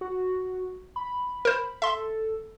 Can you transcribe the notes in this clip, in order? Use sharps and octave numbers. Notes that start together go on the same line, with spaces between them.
F#4
B5
A#4 C5
A4 E5 C6